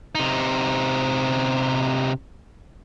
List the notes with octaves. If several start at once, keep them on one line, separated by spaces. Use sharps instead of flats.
C3 D#4